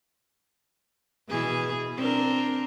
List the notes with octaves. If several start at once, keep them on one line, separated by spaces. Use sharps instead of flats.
B2 E3 G#4
C4 D4 A#4